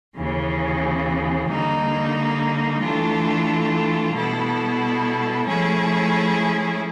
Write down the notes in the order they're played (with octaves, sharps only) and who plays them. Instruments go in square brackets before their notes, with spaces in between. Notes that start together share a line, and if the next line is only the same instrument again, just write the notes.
[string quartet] D#2 C#3 E3
D3 G3 A#3 D#4
E3 A3 D4 F4 A4
B2 G3 B3 E4 A4
F3 A3 C#4 E4 G#4